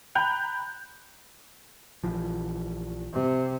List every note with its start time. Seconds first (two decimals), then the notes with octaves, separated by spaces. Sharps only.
0.15 G5 A#5 B5 F#6 G6 F7
2.04 A#1 E3 F3
3.12 C3